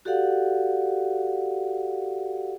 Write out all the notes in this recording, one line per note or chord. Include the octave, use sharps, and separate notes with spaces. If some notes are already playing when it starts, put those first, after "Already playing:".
F#4 G4 A4 D5 F5 F#5